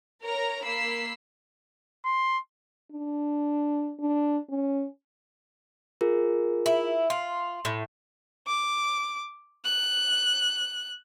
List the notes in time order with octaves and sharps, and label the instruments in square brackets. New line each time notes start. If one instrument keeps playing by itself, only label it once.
[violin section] A#4 C#5 A#5
A#3 B5 E6 C7
[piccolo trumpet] C6
[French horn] D4
D4
C#4
[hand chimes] F4 G#4 A#4
[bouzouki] E4
[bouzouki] F4 [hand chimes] C6
[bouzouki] A2
[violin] D6
F#6